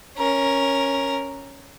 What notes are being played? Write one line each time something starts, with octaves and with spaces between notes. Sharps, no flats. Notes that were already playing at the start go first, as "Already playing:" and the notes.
C#4 A#4